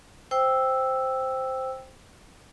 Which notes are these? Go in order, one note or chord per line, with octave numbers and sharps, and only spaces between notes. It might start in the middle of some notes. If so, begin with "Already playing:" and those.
C5 G5 E6